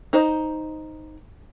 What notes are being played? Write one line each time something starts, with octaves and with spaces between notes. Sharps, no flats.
D#4 C5 D#5